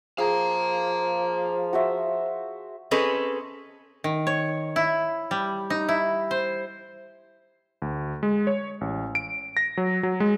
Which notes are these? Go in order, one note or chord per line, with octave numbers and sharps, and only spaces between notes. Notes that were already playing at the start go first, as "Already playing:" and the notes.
F3 G#4 F5 A#5
F#4 C5 E5
C4 C#4 G#4 A4 B4 D#5
D#3
C#5
E4
G3
D#4
E4
C5
D2
G#3
C#5
A1
D7
A#6
F#3
F#3
G#3